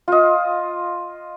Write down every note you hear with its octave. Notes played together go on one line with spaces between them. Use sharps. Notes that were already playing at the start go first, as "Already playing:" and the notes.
F4 D#5